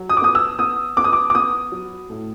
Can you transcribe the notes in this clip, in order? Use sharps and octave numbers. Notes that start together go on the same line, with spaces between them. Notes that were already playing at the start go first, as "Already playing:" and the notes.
Already playing: F#3
D#6
D6
B3 D#6
E6
B3 D#6
B3 D6
D#6
D6
D6
B3 D#6
F#3
A2